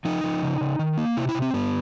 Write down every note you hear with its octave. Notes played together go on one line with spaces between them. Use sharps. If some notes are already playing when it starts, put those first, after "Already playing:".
F3 D#4
F3
C#3
C#3
D#3
A#3
C3 E4
E4
C3
C4
G2 B3